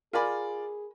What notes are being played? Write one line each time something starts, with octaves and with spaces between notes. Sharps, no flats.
F4 G#4 A#4 D5 G#5 B5